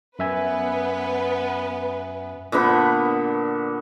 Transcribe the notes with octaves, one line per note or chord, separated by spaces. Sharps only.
F#2 B3 B4 E5 G#5
A#2 D3 B3 B5